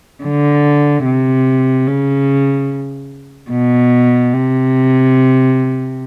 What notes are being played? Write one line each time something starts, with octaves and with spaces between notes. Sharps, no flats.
D3
C3
C#3
B2
C3